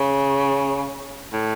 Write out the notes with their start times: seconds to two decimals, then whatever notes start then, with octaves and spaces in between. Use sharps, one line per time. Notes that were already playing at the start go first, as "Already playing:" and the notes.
Already playing: C#3
1.33 A2